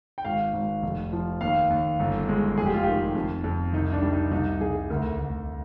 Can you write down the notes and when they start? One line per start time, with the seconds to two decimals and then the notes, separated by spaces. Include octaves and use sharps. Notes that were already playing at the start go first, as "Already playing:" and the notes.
0.18 G5
0.25 G#1 F5
0.54 G#1
0.82 F1
1.13 F3
1.41 D#2 F5
1.70 D#2
2.00 G1
2.29 G#3
2.57 F1 G#4
2.66 G4
2.74 F4
2.83 D#3 G4
3.15 F2
3.44 F2
3.73 C2 D#4
3.93 D4
4.03 G3
4.13 D#4
4.31 C2 D#4
4.61 C2 G#4
4.90 D2 A#4
5.19 D2